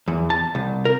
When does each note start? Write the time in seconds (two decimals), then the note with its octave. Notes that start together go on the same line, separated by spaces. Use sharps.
0.08 E2
0.30 A5
0.55 C2
0.85 A#4